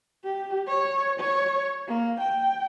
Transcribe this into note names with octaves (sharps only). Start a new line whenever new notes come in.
G4
C#5
C#5
A#3
G5